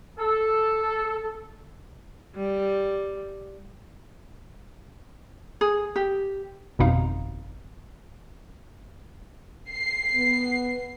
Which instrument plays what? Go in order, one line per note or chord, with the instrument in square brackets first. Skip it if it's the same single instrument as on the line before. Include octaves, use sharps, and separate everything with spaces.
[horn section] A4
[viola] G3
[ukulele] G#4
G4
[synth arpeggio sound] G1 F2 B2 D#4 F5 A#5
[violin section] C7
[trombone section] B3